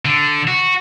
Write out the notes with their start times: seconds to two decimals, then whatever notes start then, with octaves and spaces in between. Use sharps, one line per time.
0.05 D3
0.48 F#4